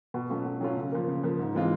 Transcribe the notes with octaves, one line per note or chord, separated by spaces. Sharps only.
B2
F#3 A3 C#4 F4
B2
F#3 A3 C#4 F4
C#3
F3 A#3
C#3
F3 A#3
G#2
E3 G#3 C4 F4